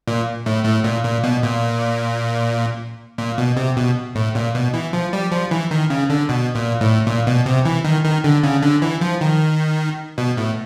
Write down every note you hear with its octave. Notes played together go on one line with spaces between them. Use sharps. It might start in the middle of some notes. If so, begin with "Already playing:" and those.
A#2
A2
A2
A#2
A#2
B2
A#2
A#2
B2
C3
B2
A2
A#2
B2
E3
F3
G3
F3
E3
D#3
C#3
D3
B2
A#2
A2
A#2
B2
C3
E3
D#3
D#3
D3
C#3
D3
E3
F3
D#3
B2
A2